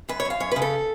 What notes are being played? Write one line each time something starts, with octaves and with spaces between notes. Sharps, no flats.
F#2 B4
C#5
F#2
F5
F#2 C#5
C#3 B4
A4